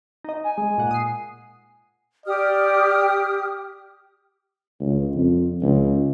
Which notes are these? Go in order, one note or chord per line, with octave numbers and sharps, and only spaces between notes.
D#4 D#5
G#5
G#3
A#2 F#5
D#6 C7
G4 D5 D#6 F6
C#2
F2
C#2